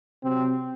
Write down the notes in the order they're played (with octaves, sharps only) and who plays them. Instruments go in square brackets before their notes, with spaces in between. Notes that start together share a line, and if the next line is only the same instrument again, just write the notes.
[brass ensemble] C3 F#3 C4